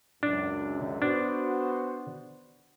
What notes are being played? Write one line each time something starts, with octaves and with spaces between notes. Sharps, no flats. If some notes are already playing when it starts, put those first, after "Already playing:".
C#2 F#2 D4
B3 D4 F#4 C5